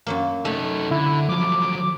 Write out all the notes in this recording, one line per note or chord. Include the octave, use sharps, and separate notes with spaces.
F#2 F#3 A#3
A3 D#4 A4
D3 E4
F3 F#3 D6